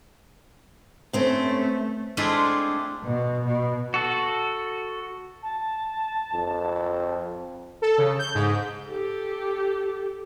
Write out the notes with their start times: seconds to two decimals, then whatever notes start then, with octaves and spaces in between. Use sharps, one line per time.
1.13 G2 A3 C4 C#4
2.17 G#3 A3 C4 D4 E4 F4
3.04 B2
3.45 B2
3.94 F#4 A4
5.43 A5
6.34 F2
7.82 A4
7.98 C#3
8.19 G6
8.35 G#2
8.87 G4 A4